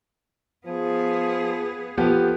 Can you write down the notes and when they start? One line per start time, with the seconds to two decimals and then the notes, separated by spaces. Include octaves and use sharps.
0.67 F3 B3 G#4
1.97 F3 B3 G4 A4